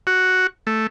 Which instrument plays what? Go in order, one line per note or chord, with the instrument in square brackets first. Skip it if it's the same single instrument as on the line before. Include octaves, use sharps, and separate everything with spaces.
[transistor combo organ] F#4
A3